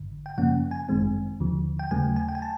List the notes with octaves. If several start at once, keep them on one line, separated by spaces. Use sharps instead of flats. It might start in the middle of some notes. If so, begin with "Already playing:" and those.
Already playing: G#1 G2 D3
G5
F#2 C#3 F3 A#3 C#4 F#5
G#5
G1 F#2 D#3 G#3 C4
D#2 D3 F3
G5
D#2 C#3 F#3 A3 G#5
G#5
G5
G#5
A5